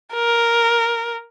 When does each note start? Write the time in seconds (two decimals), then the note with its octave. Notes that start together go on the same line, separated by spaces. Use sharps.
0.14 A#4